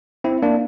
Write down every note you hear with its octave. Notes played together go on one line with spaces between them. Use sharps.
C4 E4
A#3 D4